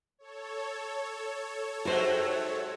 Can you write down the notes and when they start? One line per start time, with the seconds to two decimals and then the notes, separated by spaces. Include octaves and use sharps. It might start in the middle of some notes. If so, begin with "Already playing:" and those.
0.19 A4 C#5
1.85 G#2 C3 F#3 F#4 C5